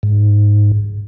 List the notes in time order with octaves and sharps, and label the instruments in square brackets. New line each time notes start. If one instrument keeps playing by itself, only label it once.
[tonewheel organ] G#2